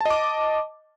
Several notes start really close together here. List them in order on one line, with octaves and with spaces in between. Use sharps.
A5 D#5 D6